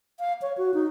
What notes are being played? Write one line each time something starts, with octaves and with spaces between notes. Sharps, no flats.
F5
C#5
F#4
D#4